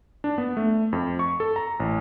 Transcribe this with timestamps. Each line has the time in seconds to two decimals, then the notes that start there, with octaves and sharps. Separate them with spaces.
0.24 D4
0.38 B3
0.57 A3
0.93 F2
1.19 C#6
1.40 A4
1.56 A#5
1.80 A1